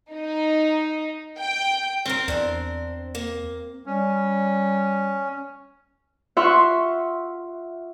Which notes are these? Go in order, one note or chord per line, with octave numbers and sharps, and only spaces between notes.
D#4
G5
C4 A#4 C5 C#5
E2 D4 C5
A#3
G3 C#4
F4 E5 F#5 C6 C#6